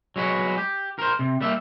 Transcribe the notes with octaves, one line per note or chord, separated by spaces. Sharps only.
F#3 G#3 B3 F#4
G4
A#4 C5
C3
G3 A#3 E5